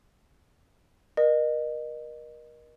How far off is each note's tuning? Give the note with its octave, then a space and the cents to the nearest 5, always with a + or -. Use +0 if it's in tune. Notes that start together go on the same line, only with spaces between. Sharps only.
A#4 +30 D#5 -30